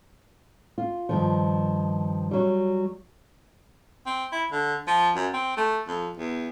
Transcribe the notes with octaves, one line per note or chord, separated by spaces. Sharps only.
F4
G2 D#3 F3
F#3 G3
C4
E4
D3
F3
F#2
C4
A3
F2
E2